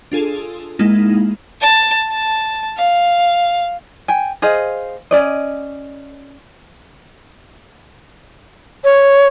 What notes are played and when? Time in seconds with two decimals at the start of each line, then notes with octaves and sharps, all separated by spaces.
0.12 D4 F4 G#4 A4
0.79 G#3 A#3 D#4 E4
1.61 A5
2.11 A5
2.78 F5
4.08 G5 G#5
4.42 G#4 C5 D#5 F5
5.11 C#4 D5 D#5
8.84 C#5